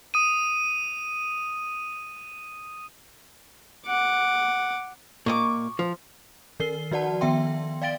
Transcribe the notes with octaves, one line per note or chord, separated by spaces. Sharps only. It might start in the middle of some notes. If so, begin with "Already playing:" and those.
D#6 D#7
F#5 D6
A#2 D#5 C#6 D6
F3
D#3 A#4 C7 G7
F3 F#4 D5 F#5 A5
D#3 B3 E5 G5 C6
D5 F5 G5 A6 D7 G7